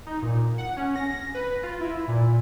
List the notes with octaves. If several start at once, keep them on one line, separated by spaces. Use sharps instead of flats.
D#4
A#2
F#5
C#4
A#6
B4
F4
E4
A#2